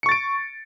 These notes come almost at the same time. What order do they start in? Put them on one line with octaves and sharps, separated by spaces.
C#7 C#6 A6 D7